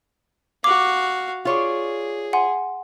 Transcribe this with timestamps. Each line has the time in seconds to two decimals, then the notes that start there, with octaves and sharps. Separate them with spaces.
0.64 F#4 F5 D6
1.45 F4 G#4 C#5 D5
2.33 F#5 G#5 C6